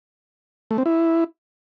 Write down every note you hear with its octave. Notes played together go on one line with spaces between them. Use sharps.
A3
C4
E4